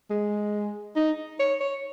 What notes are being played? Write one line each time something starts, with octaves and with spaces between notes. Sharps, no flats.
G#3
D#4
C#5
C#5